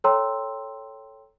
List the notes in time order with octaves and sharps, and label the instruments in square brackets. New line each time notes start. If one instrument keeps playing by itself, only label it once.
[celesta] A4 C#5 G5 A#5 C6 E6